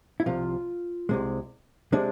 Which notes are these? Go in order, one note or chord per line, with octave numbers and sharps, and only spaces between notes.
E4
C2 C3 F3 F4
C2 C3 G#3
C3 G#3 D4